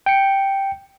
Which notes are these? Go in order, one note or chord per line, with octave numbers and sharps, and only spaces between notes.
G5 C#7